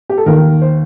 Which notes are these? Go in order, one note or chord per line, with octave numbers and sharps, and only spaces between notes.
G4
A4
D#2 D#3 A#4
C5